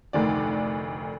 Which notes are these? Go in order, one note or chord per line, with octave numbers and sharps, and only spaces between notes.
F1 D2 D#3 D5